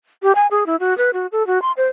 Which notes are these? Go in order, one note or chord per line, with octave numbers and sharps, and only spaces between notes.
G4
G#5
G#4
E4
F#4
B4
F#4
A4
F#4
C6
C5